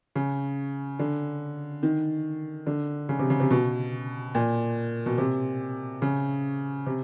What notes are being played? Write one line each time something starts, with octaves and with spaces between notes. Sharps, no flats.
C#3
D3
D#3
D3
C#3
C3
C#3
C3
B2
A#2
B2
C3
C#3
C3